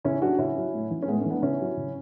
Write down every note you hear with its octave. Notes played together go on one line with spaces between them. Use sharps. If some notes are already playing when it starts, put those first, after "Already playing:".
C#3 C#4 E4
F#3 D4 F#4
C#3 C#4 E4
F#3
A2
E3
C#4
A2 G#3 B3
A3 C#4
E3
B3 D4
C#3 C#4 E4
F#3
C#3